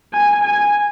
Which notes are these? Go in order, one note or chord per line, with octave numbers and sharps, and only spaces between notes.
G#5
G#5